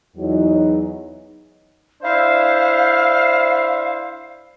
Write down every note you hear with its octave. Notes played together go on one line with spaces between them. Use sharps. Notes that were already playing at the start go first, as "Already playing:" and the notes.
E2 F#3 D#4
D4 E4 C5 F5